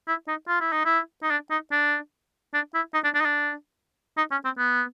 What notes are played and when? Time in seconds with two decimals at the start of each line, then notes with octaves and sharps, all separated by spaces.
0.08 E4
0.28 D#4
0.48 F4
0.60 E4
0.72 D#4
0.85 E4
1.23 D#4
1.30 D4
1.51 D#4
1.72 D4
2.54 D4
2.74 E4
2.94 D#4
3.04 D4
3.15 D4
3.20 D#4
3.25 D4
4.17 D#4
4.31 C#4
4.45 C4
4.58 B3